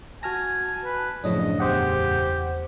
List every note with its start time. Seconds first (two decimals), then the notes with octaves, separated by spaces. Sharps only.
0.23 F#4 G#5 A5 F6 A#6
0.84 B4
1.24 F#2 A2 C#3 F3 C#4 D4 D#5
1.60 E2 G4 C5 F#5